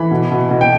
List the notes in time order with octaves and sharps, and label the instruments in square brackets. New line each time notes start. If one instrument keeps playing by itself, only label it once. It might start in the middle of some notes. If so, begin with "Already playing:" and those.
Already playing: [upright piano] E3 B5
B2
B2
B2
G5